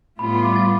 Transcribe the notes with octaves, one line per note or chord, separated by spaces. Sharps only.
A2 G3 B3 F4 B5
D6
A6